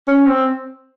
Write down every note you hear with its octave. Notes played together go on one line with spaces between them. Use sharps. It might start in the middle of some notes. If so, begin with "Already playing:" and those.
C#4
C4